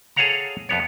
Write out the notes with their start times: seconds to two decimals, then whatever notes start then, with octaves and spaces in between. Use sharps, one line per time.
0.16 G#4 A4 C#5 F5 F#5 A#5
0.69 F2 B3 C#5